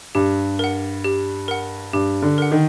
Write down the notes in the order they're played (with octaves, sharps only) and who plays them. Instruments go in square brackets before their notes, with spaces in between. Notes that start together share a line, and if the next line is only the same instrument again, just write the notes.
[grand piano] G2 [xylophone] G4
[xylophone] A#4 F#5
G4
A#4 F#5
[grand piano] G2 [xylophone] G4
[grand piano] D3
[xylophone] A#4 F#5
[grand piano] D#3